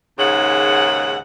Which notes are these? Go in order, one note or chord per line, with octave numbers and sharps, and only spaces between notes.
D#2 G#2 C#3 F#5